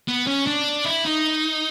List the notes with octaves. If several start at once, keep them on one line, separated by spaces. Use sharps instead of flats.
B3
C#4
D4
E4
D#4